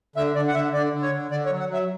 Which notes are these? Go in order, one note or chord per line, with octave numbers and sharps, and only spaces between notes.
D3 E5
D3 D5
F#5
D3 E5
D3 D5
D3
C#5
D3
D3 D5
C#5
F#3
F#5
F#3 E5